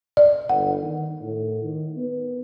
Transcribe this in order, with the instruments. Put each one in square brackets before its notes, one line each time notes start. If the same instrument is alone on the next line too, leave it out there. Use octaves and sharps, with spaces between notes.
[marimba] D5
[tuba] G1 [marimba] F#5
[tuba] D#3
A2
D#3
B3